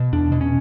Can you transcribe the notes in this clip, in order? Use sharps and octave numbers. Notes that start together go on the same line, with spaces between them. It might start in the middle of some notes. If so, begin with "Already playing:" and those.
Already playing: B2
E2 D4
B2
C#4